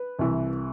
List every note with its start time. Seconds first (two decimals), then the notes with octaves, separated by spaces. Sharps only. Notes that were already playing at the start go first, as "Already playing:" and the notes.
Already playing: B4
0.19 C2 C3 E3